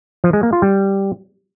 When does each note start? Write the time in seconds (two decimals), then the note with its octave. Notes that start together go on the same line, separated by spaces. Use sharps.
0.24 F3
0.33 G#3
0.43 A#3
0.53 F4
0.62 G3